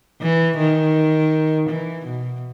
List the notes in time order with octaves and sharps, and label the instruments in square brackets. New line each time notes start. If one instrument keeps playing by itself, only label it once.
[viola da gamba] E3
D#3
E3
B2